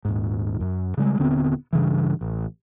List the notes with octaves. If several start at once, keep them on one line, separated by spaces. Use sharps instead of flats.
D#1 G#2
F#2
C#3 G3 G#3
D#1 D3 B3 C4
G2 C#3 E3
A1